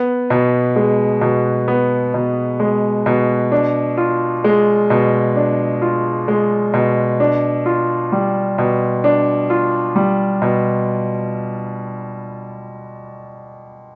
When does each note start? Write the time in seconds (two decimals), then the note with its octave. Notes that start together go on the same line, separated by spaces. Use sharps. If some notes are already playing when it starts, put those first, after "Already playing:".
Already playing: B3
0.30 B2
0.76 G#3
1.21 B2
1.68 B3
2.14 B2
2.60 G#3
3.06 B2
3.52 D4
3.97 F4
4.44 G#3
4.90 B2
5.36 D4
5.82 F4
6.28 G#3
6.74 B2
7.20 D4
7.66 F4
8.12 G3
8.58 B2
9.04 D4
9.50 F4
9.96 G3
10.42 B2